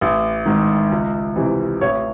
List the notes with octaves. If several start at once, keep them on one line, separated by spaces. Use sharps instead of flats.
A1
G#2 D#3
C#2
C3 E3
A1 C#5